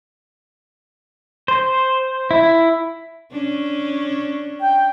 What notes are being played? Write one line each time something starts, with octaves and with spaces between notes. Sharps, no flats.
C5
E4
C#4 D4
G5